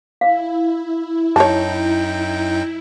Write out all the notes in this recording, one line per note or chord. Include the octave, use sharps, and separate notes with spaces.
E4 F5
F#2 D#4 C#5 G5 A5